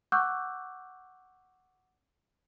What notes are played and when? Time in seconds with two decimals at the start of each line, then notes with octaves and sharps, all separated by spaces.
0.12 F#5 C#6 D6 E6 F#6 G6